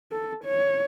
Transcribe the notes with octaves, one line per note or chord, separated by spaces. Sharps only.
A4
C#5